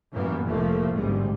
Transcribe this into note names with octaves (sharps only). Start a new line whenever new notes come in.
F#2 A2 E3 G3 A#3 B3
F1 C2 A2 F3 A3 A#3
A1 D2 G#2 G3 G#3